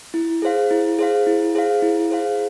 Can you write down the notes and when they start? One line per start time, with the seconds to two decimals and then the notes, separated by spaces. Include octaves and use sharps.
0.14 E4
0.42 G#4 C5 F5
0.71 E4
0.99 G#4 C5 F5
1.27 E4
1.55 G#4 C5 F5
1.82 E4
2.11 G#4 C5 F5